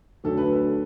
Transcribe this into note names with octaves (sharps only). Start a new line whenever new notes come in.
D2 D3 F#3 A3 A4
B4
A4